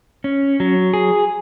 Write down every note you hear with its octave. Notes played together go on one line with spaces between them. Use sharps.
C#4
F#3
G#4